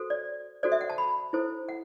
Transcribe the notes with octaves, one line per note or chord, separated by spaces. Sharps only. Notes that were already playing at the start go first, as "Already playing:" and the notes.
Already playing: F#4 A4 C5
D5
F#4 A4 C5 D5
E5
F#5
A5
B5
E4 A4 C5
F#5